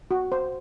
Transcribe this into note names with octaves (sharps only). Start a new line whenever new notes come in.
F#4
C5